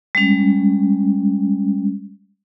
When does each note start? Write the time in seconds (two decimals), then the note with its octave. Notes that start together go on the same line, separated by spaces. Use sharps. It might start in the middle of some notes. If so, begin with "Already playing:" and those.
0.15 G3 G#3 C#4